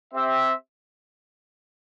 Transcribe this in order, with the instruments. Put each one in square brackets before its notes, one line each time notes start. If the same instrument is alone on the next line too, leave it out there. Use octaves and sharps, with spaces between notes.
[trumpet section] C4 G4 E5